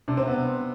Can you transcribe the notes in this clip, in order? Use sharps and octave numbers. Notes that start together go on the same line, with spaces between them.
C3 D4
C4
C3 B3